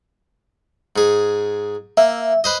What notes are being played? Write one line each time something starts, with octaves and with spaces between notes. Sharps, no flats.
G#2 G#4
A#3 E5
B4 C5 D#5